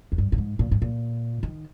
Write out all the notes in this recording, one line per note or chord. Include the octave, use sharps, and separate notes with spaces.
F2
G2
A#2
G#2
A#2
G#2
A#2
D#3